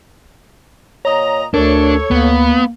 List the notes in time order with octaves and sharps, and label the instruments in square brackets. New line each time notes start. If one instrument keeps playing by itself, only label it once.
[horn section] A#2 D#5 A#5 [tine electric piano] C#5
[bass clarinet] D2 [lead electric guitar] D4 [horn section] A4 C#5 [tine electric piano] A#4
[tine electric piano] D2 [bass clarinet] A#3 [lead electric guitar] B3